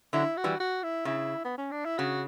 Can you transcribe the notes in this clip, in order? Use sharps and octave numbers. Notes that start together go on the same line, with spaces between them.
D3 F#3 E4
F#4
E3 G3
F#4
E4
C#3 E4
B3
C#4
D4
E4
C#3 F#4